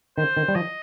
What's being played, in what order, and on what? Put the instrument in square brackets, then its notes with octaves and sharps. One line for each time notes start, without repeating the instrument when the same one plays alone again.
[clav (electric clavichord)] D#3 [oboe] C5
[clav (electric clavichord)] D#3
G3
[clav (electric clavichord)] F3 [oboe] D#5